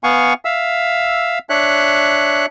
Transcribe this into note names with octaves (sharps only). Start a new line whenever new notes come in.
B3 F5 F#5 G#5 C#6
E5 F5 E6
D4 C#5 E5 F#6